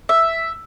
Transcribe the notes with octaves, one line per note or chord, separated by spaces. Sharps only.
E5